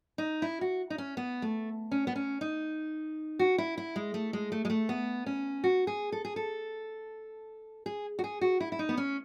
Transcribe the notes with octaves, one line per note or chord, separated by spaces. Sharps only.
D#4
E4
F#4
D#4
C#4
B3
A3
C#4
B3
C#4
D#4
F#4
E4
E4
G#3
A3
G#3
A3
G#3
A3
B3
C#4
F#4
G#4
A4
G#4
A4
G#4
F#4
G#4
F#4
E4
E4
D#4
B3
C#4